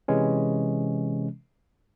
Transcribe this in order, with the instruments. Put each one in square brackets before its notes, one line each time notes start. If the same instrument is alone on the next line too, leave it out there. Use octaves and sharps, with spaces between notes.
[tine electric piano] C3 E3 G#3 C#4